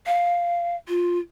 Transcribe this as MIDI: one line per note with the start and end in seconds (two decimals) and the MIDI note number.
0.07 0.76 77
0.88 1.19 65